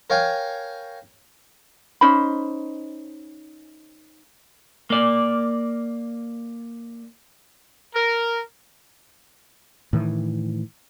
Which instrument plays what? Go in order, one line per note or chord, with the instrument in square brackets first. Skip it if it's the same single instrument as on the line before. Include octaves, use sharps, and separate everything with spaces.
[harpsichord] A#4 C#5 F5 G5 G#5
[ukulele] C#4 D#4 C5 B5
[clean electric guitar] A#3 D5
[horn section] A#4
[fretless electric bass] A2 D#3 E3